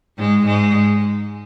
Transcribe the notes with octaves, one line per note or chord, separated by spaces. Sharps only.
G#2 G#3
G#2 G#3